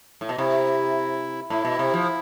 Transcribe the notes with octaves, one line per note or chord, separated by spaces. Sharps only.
A2
B2
C3 E4
A2 E4
B2
C3
F3